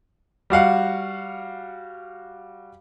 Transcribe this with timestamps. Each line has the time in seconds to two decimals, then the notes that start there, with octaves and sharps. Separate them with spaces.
0.50 G3 F#4 F5 F#5